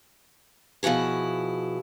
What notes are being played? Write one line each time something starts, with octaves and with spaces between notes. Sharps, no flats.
B2 F3 E4 F#4 G#4